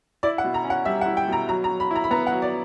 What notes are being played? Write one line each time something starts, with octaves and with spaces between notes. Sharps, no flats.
E4 D5
F#5
B2
A#5
C#4
F#5
G3 E5
F#5
E4
G5
B2 A#5
F#3 A#5
A#5
F#3
B5
E4 A#5
B5
B3 A#5
F#5
F#3
D5